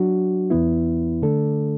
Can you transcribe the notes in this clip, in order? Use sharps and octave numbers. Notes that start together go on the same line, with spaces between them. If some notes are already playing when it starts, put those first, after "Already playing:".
Already playing: F#3 D4 F#4
E2 E3 B3 E4
D3 A3 D4 A4